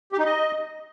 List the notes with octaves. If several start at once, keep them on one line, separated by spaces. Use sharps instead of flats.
G4
D#4
D#5